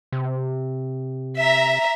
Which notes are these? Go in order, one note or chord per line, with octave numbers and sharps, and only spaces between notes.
C3
E5 A#5